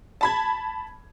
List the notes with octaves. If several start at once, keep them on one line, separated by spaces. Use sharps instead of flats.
A5 B5 G#6